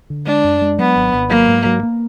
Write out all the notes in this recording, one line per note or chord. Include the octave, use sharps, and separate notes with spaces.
D3
G#3 D4
F#2
G#3
F#3 B3
G#1
G#1
F#3 A#3
G#2
F#3
A#3